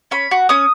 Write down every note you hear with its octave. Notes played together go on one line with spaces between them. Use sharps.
C#4 B5
F#4
C#4 D#6